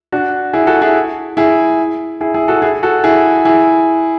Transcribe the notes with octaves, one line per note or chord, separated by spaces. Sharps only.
D4 F#4
E4 G#4
F#4 A4
E4 G#4
E4 G#4
E4 G#4
E4 G#4
F#4 A4
E4 G#4
F#4 A4
E4 G#4
E4 G#4